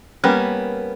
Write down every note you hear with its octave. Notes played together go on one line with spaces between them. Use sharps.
G3 A#3 B3 C#4